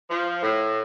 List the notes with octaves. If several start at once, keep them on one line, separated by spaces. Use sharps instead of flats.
F3
A2